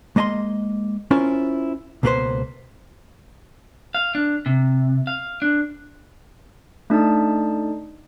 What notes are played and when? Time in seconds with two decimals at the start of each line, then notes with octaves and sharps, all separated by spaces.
0.16 G#3 A#3 D#5 G#5 C6
1.11 C#4 E4 F4 A#4 C5
2.03 C#2 B2 A#3 D#4 B4 C5
3.95 F5
4.15 D4
4.46 C3
5.07 F5
5.42 D4
6.90 A3 D4 D#4 A5